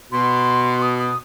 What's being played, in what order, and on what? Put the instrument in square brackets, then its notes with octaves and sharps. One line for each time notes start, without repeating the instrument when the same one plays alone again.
[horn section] B2 [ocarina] C6
[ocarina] D#6
D#6